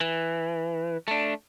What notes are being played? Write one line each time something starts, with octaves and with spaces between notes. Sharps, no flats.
E3
A3 D4